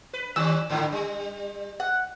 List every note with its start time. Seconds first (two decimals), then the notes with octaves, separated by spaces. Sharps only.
0.13 B4
0.36 D#3 G3 C#4 E6
0.70 G#2 D3 E4
0.92 G3
1.80 F#5